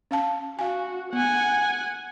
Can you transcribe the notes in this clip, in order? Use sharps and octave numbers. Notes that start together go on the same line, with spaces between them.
C#4 F5 A5
F#4 F5 G#5
B3 F#5 G#5